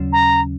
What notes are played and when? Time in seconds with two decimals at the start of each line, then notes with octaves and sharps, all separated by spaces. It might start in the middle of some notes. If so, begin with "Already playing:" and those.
Already playing: D#2 C#3 F#3 C#4
0.13 A#5